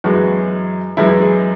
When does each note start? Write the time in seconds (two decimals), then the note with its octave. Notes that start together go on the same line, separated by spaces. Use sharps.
0.04 F#2 E3 G#3 F#4
0.97 F#2 E3 G#3 E4
1.22 G#4